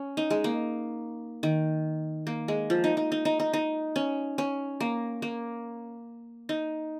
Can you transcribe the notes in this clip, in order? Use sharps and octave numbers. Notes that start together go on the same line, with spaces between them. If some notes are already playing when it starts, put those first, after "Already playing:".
Already playing: C#4
D#4
G#3
A#3
D#3
A#3
G#3
F3
D#4
D#4
D#4
D#4
D#4
D#4
C#4
C#4
A#3
A#3
D#4